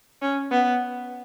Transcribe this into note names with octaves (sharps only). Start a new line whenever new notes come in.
C#4
B3